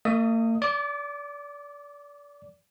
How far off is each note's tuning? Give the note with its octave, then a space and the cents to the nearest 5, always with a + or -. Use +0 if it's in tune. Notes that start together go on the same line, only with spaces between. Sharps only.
A#3 -45 D#5 +10 D#6 +0
D5 -30 D6 +0